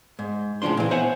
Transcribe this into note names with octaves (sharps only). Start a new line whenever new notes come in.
G#2
A2 C#3 F3 D4 C6
A#2 E3
B3 C5 C#5 E5 F#5 G#5